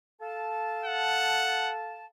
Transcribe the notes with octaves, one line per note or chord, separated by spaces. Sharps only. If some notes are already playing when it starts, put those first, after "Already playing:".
A4 F5 A5
F#5